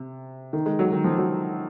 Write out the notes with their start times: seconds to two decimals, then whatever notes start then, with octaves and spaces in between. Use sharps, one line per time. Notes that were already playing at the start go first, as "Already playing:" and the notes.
Already playing: C3
0.53 D#3
0.66 G#3
0.79 F#3
0.92 D#3
1.04 F3
1.17 F#3